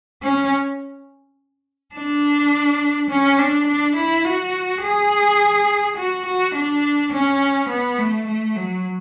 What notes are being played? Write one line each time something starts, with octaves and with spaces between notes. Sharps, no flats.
C#4
D4
C#4
D4
D4
E4
F#4
G#4
F#4
F#4
D4
C#4
B3
A3
A3
F#3